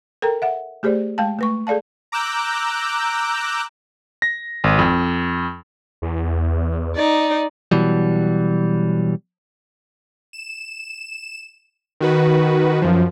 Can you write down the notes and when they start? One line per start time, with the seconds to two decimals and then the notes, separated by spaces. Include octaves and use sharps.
0.22 A4 A#4 G5 A#5
0.42 E5 F#5
0.83 A3 G4 G#4 C5 D5
1.18 G#3 F5 G5 A5
1.39 A3 B4 C#6
1.67 G#4 A4 D5 F5 A5
2.12 A#5 D6 E6 F#6 G6
4.22 A#6
4.64 G#1
4.79 F2
6.02 E2
6.96 D#4 D5
7.72 B2 E3 F#3 G3
10.33 E7
12.01 D#3 F#4 B4
12.82 F#2 F3